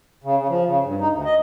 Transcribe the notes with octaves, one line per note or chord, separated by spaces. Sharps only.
C#3
C#3
F3
C#3
G2
D#4
D2
D#5